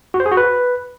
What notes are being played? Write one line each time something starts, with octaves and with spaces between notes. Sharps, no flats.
F#4
C5
G#4
F#4
B4